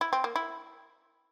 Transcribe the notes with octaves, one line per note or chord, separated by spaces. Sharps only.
E4
C4
A#3
E4